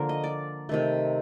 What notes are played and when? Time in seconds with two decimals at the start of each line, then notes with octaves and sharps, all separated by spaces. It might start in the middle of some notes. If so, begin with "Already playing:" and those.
Already playing: D3 F3 A#3 A#4
0.09 D#5
0.24 D5
0.69 C3 D#3 A3